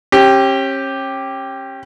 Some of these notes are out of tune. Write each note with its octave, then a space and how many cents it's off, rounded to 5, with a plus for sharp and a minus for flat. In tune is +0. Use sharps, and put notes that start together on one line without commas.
C#4 -35 G4 +0